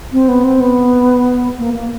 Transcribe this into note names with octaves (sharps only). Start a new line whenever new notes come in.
C4
B3
C4
B3
A#3
A#3